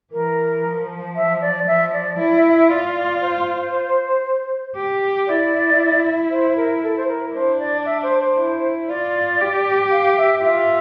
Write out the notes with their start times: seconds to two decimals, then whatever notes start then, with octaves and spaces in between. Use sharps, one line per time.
0.12 E3 A#4
0.64 F3
1.16 E5
1.41 D5
1.67 F3 E5
1.93 D5
2.19 E4 D5
2.36 E5
2.53 E5
2.70 F4 D5
2.96 D5
3.21 C5
4.76 G4
5.28 E4 D5
6.31 C5
6.56 A#4
6.83 A4
6.96 C5
7.08 A#4
7.34 D4 C5
7.59 D5
7.85 E5
8.03 C5
8.20 C5
8.37 E4
8.88 F4 D5
9.41 G4
9.91 F5
10.17 E5
10.43 F4 E5